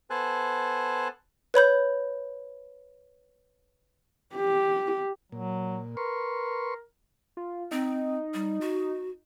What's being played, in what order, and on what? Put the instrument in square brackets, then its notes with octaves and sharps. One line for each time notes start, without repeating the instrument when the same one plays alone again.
[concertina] B3 A4 C5 G#5 A5 F#6
[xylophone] B4 C#5 B5 G6
[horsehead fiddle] G4
[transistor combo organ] A#2 [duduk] F#3
[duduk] A#4 [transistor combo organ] B4 C6 C#6
[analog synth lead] F4
[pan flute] C4 [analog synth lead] D#4
[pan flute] G3
F#4